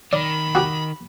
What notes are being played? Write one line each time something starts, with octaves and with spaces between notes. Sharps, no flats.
D#3 D5 B5
F#4 G4